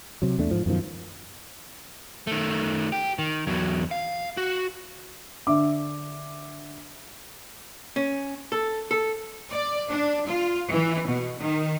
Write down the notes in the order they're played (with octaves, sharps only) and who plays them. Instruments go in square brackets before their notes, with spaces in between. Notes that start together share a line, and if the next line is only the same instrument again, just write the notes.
[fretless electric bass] C3 F#3
E2 A3 D4
G#2 F3
F#2 B2 D#3 F3
[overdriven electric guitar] D#3 A3
G4
D#3
E2 F#3
F5
F#4
[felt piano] D3 E5 D6
[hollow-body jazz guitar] C#4
A4
A4
[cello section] D5
D4
F4
E3
B2
D#3